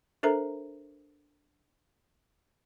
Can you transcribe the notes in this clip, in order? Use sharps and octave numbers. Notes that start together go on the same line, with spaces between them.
D4 A4 A#4 C5 E5 A#5